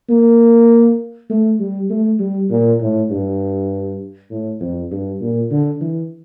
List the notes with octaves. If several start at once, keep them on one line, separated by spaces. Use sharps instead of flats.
A#3
A3
G3
A3
G3
A#2
A2
G2
A2
F2
G2
A#2
D3
E3